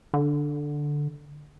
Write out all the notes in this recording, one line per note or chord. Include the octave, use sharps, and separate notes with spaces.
D3